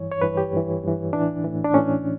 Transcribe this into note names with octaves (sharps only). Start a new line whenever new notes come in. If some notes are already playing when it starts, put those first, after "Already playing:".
Already playing: G2 E3 C#5
C#5
G2 E3 B4
G4
G2 E3
G2 E3
A2 E3 D4
A2 E3
D4
A2 E3 C#4